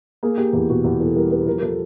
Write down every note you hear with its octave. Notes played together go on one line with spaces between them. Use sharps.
A#3 G#4
A#3 G4
E2 G4
B2 F#4
E2 G4
E2 A4
G3 A#4
G3 B4
F3 A#4
A#4
F3 A4